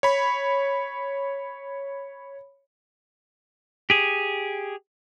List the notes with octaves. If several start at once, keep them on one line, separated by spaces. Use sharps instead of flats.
C#5 B5
G4 G#4